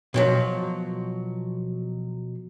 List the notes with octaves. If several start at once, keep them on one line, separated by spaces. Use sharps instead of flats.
B2 F3 F#3